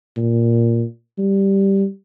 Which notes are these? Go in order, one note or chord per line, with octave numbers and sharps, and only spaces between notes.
A#2
G3